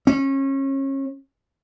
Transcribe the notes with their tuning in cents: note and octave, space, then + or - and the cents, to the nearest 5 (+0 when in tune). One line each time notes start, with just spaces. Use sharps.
C#4 -30